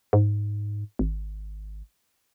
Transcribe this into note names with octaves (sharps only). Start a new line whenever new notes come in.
G#2
G#1